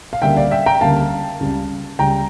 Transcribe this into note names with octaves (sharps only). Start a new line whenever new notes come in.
F5
D2 C#3 G3 A#3 E5 G5
D5 F5
E5 G5
G5 A#5
D2 C#3 G3 A#3 F5 A5
C#2 C#3 G3
C#2 C#3 G3 G5 A#5